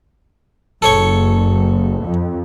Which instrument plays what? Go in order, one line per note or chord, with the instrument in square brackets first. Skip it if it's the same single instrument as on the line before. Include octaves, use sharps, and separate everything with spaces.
[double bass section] F#1 [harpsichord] A4 C#5 C#6
[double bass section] F2